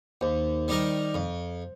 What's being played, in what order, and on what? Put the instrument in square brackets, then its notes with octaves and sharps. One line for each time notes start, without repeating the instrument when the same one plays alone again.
[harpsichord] D#2 [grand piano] C5
[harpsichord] D#3 G3 D#4 A#4
F2